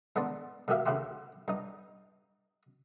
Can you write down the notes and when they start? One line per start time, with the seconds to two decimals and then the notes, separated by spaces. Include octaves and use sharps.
0.16 G#2 B3 D4 A5 C6
0.68 G#2 D#3 F#4 G4 E5 F5
0.86 D2 C#3 E4 F#4 G4 C6
1.48 G2 D#4